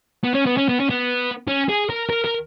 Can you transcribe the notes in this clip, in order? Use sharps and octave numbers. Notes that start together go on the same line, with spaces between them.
B3
C#4
B3
C#4
B3
C#4
B3
C#4
G#4
A#4
A#4
A#4